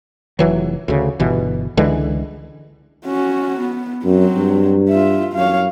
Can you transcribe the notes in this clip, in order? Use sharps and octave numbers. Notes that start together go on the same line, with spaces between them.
F1 E3 F#3
D2 C#3
G1 B2 E3
C#2 D3 E3 G#3
C#4 F#4
B3
F#2 F#3 C4
G2
F4 E5
F#2 C#5 F5